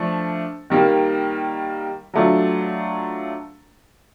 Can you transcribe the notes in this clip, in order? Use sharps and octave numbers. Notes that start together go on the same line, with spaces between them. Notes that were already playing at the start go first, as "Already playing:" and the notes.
Already playing: F3 A3 D4
D#3 G3 A#3
F#3 A3 D4 F4